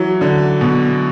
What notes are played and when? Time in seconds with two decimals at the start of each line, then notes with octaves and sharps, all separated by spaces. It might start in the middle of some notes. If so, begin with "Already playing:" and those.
Already playing: E3 F#3
0.21 D3
0.61 B2